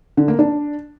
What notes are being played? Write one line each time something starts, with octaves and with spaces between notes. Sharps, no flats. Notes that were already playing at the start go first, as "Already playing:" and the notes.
D3
A#3
D4